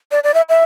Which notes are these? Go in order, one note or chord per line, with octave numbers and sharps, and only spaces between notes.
D5
D5
E5
E5